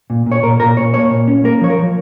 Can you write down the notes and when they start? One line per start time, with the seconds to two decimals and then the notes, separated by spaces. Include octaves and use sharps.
0.10 A#2
0.26 A#2
0.32 C#5
0.43 A#2 A#4
0.60 A#2 A#4
0.77 A#2 C#5
0.94 A#3 C#5
1.10 A#2
1.27 C#4
1.44 A#3 A#4
1.61 F3 C#5
1.70 A#4
1.78 F3